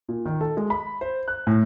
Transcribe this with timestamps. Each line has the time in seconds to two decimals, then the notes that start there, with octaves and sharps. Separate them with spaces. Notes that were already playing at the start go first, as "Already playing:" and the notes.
0.09 A#2
0.26 D#3
0.41 A4
0.57 G#3
0.70 B5
1.01 C5
1.28 F#6
1.47 A2